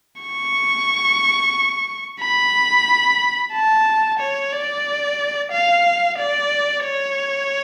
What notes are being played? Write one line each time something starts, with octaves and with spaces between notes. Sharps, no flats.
C#6
B5
A5
C#5
D5
F5
D5
C#5